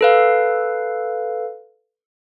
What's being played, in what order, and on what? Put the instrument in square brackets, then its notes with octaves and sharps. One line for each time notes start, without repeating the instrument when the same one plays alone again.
[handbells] A4 B4 F5